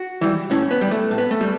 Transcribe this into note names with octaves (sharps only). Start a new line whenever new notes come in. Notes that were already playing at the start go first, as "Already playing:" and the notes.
Already playing: F#4
E3 G3
A2 C#4
B3
G3
A3
A2
B3
A3
G3